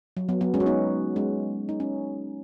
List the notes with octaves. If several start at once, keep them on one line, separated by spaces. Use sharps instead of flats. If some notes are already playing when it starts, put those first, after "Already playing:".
F#3
F#3 B3
F#3 B3
G#3 C#4
F#4
B3 D#4
G#3 C#4
D#4
C#4